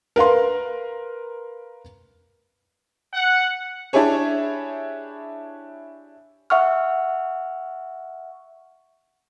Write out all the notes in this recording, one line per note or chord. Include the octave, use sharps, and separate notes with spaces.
A#4 B4 F5 C6
F#5
D4 E4 G4 G#4 C#5
E5 F#5 C#6 F6